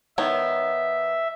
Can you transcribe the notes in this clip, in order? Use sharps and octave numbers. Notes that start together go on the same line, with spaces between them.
D#3 B3 C#5 E5